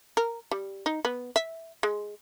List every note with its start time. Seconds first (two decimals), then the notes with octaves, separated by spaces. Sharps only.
0.17 A#4
0.51 G3
0.86 D#4
1.05 B3
1.36 E5
1.83 G#3